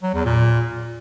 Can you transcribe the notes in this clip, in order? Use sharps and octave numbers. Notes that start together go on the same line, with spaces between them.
F#3
E2
A#2